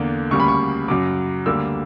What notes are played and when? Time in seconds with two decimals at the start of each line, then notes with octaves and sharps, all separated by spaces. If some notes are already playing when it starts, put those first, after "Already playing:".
Already playing: E2 D3 A#3
0.31 D2 C#3 G3 A#3 C#6
0.40 B5
0.48 C#6
0.88 F#2 C#3 F#3 D6
1.46 D2 D3 G3 A#3 E6